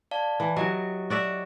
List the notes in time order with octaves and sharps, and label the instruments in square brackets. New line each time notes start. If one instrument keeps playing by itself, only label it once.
[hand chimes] D5 F5 A5
[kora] E3
[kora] F#3 [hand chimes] E4 G4 D#5
[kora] F#4 D5 E5